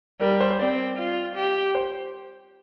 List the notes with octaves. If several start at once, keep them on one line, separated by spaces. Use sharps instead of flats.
G3 A#4
A#4
C5
C5
C4 D5
F4
G4
C5